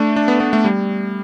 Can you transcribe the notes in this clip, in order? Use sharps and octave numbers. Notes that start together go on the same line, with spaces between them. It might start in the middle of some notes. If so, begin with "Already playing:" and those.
Already playing: A3 D4
D4
B3
B3
A3
G3